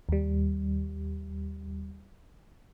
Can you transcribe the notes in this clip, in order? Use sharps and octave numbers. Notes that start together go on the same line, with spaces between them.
D#2 G3